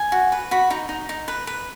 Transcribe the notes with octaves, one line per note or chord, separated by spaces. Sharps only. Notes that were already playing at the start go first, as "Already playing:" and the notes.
Already playing: G#5
F#4
B4
F#4 B5
D#4
D#4
D#4
B4
B4